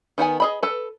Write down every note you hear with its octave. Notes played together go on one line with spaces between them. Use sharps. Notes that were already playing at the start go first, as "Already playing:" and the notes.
D#3 B3 F#5 G#5
G#4 D#5 B5
A4 B4